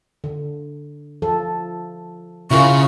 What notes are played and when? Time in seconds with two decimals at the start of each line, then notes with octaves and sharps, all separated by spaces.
0.24 D3
1.22 F3 A4
2.51 C#3 E4 F4 G#4 A#4 C#6